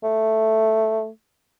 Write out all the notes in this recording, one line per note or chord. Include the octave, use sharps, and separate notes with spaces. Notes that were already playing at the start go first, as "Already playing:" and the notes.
A3